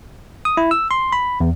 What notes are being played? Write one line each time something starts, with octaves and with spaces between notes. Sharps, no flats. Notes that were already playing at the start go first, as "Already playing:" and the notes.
D#6
E4
E6
C6
B5
E2